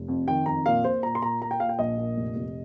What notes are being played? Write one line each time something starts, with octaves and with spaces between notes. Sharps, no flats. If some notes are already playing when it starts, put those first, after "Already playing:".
Already playing: F1
F2
D#3 G5
F2 A#5
A#2 F5
A#2 C5
A#2 A#5
C6
A#2 A#5
A#2 A#5
G5
A#2 F5
G5
A#1 D#5
A#2
F1
F1